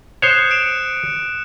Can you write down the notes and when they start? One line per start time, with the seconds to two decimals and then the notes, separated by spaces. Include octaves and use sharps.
0.22 C5 C#5 D#6 F#6 E7
0.51 C#7 D7 E7